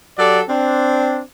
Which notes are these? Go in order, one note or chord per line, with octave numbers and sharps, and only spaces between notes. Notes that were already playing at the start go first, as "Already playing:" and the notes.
F#3 G4 A4 D5
C4 D4